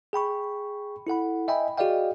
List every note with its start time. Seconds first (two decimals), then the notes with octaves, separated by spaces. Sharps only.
0.13 G#4 G5 B5 C#6
1.07 E4 A4 F#5 B5
1.48 D#5 E5 G5 G#5 B5
1.77 F#4 G#4 D5 D#5 F5 G5